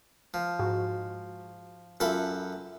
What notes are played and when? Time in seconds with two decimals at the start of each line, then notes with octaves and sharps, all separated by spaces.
0.34 F3
0.59 G#2 F#4
2.00 F#2 F4 A4 E5 B5